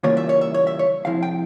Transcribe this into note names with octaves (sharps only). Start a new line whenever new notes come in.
C#3 E3 G3 A#3 F4 C#5
E5
C#5
E5
C#5
E5
C#5
C3 F3 G#3 E4 F5
G5